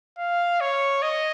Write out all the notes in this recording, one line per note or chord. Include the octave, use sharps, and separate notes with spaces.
F5
C#5
D#5